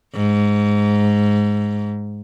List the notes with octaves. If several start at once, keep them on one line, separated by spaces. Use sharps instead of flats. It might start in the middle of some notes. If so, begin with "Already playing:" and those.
G#2